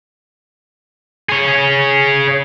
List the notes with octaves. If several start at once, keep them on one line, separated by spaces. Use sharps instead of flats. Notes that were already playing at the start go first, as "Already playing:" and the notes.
G#4 C#5